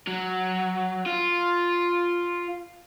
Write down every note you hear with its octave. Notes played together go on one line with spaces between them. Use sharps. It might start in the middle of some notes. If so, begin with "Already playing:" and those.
F#3
F4